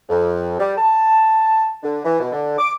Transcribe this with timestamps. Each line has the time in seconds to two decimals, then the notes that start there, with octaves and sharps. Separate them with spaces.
0.09 F2
0.59 G3
0.77 A5
1.83 D3
2.04 E3
2.20 B2
2.32 D3
2.58 D6